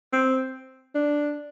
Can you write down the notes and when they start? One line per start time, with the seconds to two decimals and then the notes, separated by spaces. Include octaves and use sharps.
0.13 C4
0.95 D4